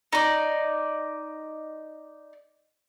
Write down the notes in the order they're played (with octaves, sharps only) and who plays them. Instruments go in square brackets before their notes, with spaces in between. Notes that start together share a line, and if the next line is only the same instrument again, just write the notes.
[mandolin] D#4 D5